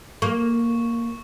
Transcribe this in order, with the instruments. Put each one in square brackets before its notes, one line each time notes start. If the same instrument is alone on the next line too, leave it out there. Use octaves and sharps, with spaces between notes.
[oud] A#3 [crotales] C#6